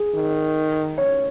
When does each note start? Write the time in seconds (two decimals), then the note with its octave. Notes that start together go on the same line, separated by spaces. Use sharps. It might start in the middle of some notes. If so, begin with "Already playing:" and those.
Already playing: G#4
0.15 D#3
0.98 C#5